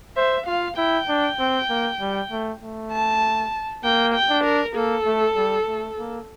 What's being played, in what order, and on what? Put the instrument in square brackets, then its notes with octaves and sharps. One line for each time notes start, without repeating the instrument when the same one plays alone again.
[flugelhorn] C5 [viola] E5
[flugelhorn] F4 [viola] F5
[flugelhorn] E4 [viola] G5
[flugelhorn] D4
C4
A#3
G3
A3
A3
[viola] A5
[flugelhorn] A#3 [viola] G5
[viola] G5
[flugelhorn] D4
[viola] A#4
[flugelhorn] A#3 [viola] A4
[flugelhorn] A3
G3
A3
A#3